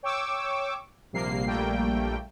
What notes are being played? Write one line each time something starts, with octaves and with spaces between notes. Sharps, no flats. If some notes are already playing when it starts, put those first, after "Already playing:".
C#5 G5 C#6 D6 E6
A#1 C3 G3 A#3 C7
A#1 G3 A3 A#3 G5